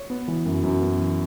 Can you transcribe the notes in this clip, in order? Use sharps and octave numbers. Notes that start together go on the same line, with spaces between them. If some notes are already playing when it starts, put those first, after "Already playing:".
Already playing: C#5
B3
E3
F#2
F#2
B3
E3